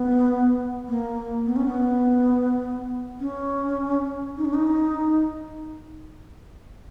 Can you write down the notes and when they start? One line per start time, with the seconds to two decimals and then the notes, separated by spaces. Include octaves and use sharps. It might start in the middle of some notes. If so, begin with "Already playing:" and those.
Already playing: B3
0.88 A#3
1.46 B3
1.56 C#4
1.66 B3
3.20 C#4
4.37 D#4
4.45 C#4
4.54 D#4